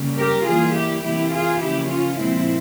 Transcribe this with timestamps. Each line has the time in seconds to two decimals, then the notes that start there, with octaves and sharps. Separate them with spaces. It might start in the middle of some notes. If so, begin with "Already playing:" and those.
Already playing: C#3 G3 A#3
0.16 G4 A#4
0.45 E3 G3 A#3 F4 G#4
0.74 E4 G4
1.02 C3 E3 A#3 E4 G4
1.31 F4 G#4
1.59 C#3 F3 A#3 E4 G4
1.87 C#4 F4
2.17 A#2 F3 G#3 C4 E4